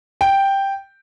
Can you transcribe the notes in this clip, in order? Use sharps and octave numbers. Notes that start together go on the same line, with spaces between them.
G5